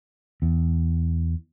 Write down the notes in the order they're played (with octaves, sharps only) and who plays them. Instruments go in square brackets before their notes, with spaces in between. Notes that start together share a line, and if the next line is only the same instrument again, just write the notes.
[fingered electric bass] E2